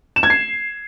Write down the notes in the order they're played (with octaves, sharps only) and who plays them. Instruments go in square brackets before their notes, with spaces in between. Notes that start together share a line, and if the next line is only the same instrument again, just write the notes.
[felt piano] E7
G#6
C7